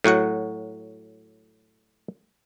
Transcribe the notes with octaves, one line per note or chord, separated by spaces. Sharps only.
A2 F#3 F#4 F#5